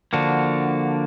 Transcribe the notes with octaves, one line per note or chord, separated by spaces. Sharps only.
D3 F3 A#3 D4 F#4